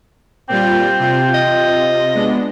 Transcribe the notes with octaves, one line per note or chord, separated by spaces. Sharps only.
A#2 G3 C4 F4 G5
C3 F4
D#5
G#3 B3 D4